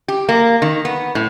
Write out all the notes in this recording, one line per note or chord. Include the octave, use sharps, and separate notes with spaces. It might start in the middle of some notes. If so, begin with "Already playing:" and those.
G4
A#3
D#3
B3
A2